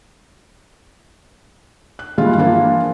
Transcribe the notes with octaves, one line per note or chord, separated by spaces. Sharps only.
F#6
G2 A#2 E3 G3 G#3 F4
E3 F3 A#3 D4 F4